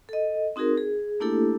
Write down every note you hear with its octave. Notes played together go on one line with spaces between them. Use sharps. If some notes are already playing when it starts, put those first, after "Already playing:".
A4 D#5
C4 D#4 F#4 G#4 A#4
G#4
A3 A#3 D4 E4 G4 A4